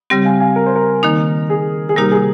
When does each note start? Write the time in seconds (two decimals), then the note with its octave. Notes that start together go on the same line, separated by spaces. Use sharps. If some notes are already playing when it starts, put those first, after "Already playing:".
0.10 C#3 G3 C4 G4
0.25 F5 G#5
0.40 F5 G#5
0.56 A#4
0.66 C5
0.76 A#4
1.03 D#3 A#3 D#4
1.50 G#4
1.89 G#4
1.96 C3 G3 A#3 D#4 G4 A#4
2.11 G#4